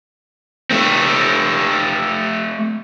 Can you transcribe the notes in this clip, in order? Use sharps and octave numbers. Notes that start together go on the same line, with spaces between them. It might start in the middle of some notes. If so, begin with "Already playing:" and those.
A3 C4